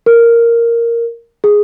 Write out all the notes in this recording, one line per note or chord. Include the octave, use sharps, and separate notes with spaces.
A#4
G#4